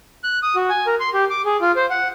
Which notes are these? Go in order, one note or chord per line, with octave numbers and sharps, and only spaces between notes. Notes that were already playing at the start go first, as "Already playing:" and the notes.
F#6
D#6
F#4
G#5
A#4
C6
G4
D6
G#4
F4
C5
F#5